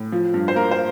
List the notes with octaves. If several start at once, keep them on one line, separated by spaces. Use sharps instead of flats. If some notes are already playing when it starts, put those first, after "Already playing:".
Already playing: A2
F3
G2
C5
A#3 A#4
C5